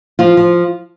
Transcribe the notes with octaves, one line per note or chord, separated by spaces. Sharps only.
F3 F4
F3